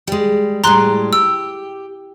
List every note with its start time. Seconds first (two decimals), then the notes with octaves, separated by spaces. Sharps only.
0.07 G3 G#3
0.64 A2 G3 G#3 A#5 C6 F#6
1.13 G4 E6